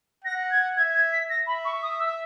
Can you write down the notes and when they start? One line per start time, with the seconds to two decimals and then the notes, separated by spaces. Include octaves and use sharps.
0.24 F#5 A#6
0.51 G#6
0.77 E5 G#6
0.95 G#6
1.12 B6
1.30 E5 A#6
1.47 B5
1.65 C#6
1.83 D#6
2.00 E6